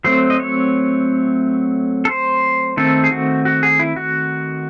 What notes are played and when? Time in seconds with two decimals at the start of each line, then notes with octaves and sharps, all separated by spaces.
0.04 F#3 A3 C4 C5
0.30 D#5
0.40 C#5
2.05 A4
2.09 C5
2.77 D#3 A3 C4 A4
3.04 G#4
3.11 F#4
3.45 F#4
3.63 G#4
3.79 E4
3.96 F#4